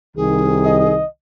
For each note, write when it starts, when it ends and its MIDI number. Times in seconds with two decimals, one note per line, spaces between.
0.16 1.01 36
0.16 1.01 51
0.16 0.96 68
0.66 1.07 75